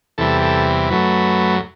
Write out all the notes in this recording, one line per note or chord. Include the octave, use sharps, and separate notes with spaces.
E2 C3 E3 G3 A4
A4
F#2 F#3 A3 B4